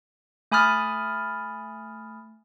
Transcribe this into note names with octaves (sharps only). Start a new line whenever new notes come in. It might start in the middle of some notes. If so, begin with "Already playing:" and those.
A3 G#5 B5 D#6 F6 A6